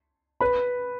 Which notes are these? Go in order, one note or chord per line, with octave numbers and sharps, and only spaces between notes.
B4 B5